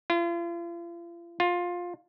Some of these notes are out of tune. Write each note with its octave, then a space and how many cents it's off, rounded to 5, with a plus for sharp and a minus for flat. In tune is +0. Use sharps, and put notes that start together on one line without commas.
F4 -40
F4 +15